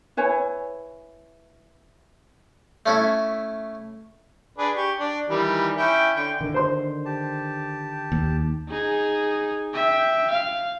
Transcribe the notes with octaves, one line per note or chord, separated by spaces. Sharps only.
E4 B4 C#5 G#5
A3 C#4 E4
D4 G#4 B4
G4 C#6
D4
D#3 E3 G3
C#4 E4 G5
D3 G5
D3 D#3
C5 C6
G4 A5
D#2
D#4 G#4
E5 G5
F5